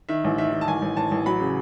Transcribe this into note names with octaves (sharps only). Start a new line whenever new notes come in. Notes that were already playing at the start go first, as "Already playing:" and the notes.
D#3 E5
A1
D#3 E5
D#3
A5
A1 G#5
A1
A1 A5
A1
F#3 B5
C#3